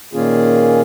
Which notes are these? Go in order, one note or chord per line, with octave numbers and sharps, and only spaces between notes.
A#2 D#3 A#3 C#4 F4 G#4